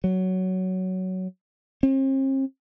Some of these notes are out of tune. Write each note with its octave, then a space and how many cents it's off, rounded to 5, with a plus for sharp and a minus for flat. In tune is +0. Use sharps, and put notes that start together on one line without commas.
F#3 +10
C4 +45